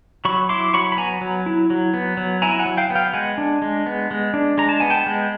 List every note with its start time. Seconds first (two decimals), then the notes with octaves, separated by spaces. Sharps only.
0.25 F#3 B5 C#6
0.49 E4 C6 D6
0.74 F#3 B5 C#6
0.92 B5
0.97 B3 G#5 A#5
1.21 F#3
1.46 E4
1.70 F#3
1.94 B3
2.17 F#3
2.42 E4 G#5 A#5
2.59 F#5 G#5
2.65 F#3
2.77 F5 G5
2.90 B3
2.95 F5 G5
3.13 G#3 F#5 G#5
3.38 D4
3.62 G#3
3.86 B3
4.11 G#3
4.34 D4
4.58 G#3 A#5
4.69 A5
4.80 B3 G#5
4.90 G5 A5
5.07 G#3